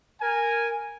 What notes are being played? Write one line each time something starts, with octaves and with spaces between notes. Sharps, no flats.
A#4 G#5